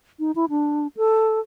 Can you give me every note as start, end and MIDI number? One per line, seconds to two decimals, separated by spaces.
0.19 0.31 63
0.35 0.46 64
0.50 0.87 62
0.97 1.40 69